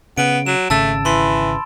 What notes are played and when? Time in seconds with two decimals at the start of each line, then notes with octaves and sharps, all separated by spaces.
0.18 C#3 B3 D7
0.46 F#3 E7
0.70 G#1 C#3 A3 A5 E6 A6
1.05 E3 B5 C6